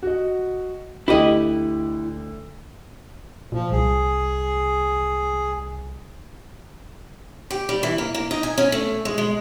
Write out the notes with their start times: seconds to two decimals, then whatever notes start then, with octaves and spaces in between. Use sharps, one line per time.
0.03 F#4 D#5
1.08 D2 E4 G4 D#5
3.52 A#2 F3
3.72 C2 G#4
7.51 G4
7.69 G3
7.83 E3
7.98 A#3
8.14 A#3
8.31 D#4
8.43 G#5
8.58 C#4
8.72 A3
9.05 G#3
9.18 G#3